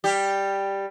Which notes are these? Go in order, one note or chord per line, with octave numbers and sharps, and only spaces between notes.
G3 G4